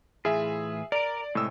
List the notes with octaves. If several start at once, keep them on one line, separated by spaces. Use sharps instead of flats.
A2 E3 F4 G#4 E5
A#4 D5 D7
A2 C3 G#3 A3 E6